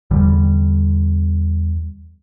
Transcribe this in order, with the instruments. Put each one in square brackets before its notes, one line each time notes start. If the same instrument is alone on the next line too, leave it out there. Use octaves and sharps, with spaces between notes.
[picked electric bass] E2 D3 G3